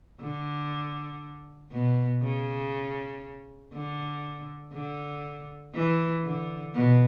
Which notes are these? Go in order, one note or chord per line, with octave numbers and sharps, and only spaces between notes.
D3
B2
C#3
D3
D3
E3
D3
B2